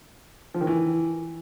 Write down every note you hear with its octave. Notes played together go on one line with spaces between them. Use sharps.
F3
D#3
E3